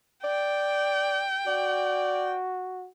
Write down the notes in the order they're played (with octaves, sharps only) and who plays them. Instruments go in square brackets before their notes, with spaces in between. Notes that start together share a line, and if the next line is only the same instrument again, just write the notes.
[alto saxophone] D5 [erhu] G5
[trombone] F#4 [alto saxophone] D5